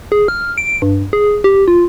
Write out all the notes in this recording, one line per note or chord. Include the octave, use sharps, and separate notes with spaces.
G#4
F6
D7
G2
G#4
G4
F4